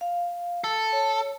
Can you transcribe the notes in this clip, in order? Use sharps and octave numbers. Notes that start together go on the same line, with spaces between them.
F5
A4
C#5